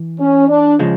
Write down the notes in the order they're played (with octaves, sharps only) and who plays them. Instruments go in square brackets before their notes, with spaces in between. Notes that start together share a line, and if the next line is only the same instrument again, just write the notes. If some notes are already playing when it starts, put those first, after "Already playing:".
Already playing: [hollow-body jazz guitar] E3
[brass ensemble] C#4
D4
[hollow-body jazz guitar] C#3 F3 G#3